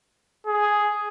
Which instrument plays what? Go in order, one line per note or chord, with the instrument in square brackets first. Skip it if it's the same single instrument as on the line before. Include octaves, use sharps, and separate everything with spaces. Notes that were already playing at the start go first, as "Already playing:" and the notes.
[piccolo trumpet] G#4